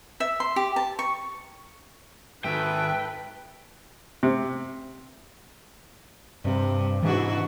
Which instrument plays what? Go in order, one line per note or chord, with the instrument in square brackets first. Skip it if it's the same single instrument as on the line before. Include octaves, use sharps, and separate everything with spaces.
[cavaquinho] E5
C6
G4
A5
C#6
[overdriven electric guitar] G#2 D#3 [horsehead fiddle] A4 B4 [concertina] E5 [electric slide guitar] G5
[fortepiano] C3
[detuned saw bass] G2 [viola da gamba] C3
[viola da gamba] G#2 D4 F#4 [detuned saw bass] E3